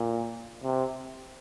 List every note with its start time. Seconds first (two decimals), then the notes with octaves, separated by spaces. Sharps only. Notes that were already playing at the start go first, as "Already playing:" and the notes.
Already playing: A#2
0.64 C3